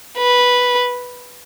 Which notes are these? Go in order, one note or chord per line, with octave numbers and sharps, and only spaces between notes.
B4